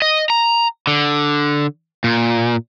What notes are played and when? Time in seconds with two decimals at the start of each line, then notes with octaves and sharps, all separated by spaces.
0.02 D#5
0.30 A#5
0.87 D3
2.04 A#2